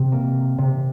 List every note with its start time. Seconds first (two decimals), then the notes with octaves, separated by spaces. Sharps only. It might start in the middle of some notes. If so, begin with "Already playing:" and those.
Already playing: C3
0.12 A#3
0.58 C3